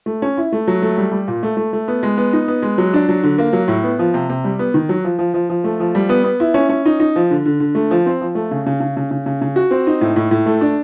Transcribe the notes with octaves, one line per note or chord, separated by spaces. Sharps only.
A3
C#4
E4
A3
F#3
A3
G3
G3
A#2
A3
A3
A3
B3
G#3
B3
D#4
B3
G#3
F#3
D4
F#3
D3
A#3
F#3
A2
B3
F3
C3
C3
G3
B3
D#3
F#3
F3
F3
F3
F3
A3
F3
G3
B3
B3
E4
C#4
C#4
D#4
D#4
F3
D3
D3
D3
A3
F3
C4
F3
A3
C#3
C#3
C#3
C#3
C#3
C#3
C#3
F#4
C4
D#4
A2
A2
A2
A3
D4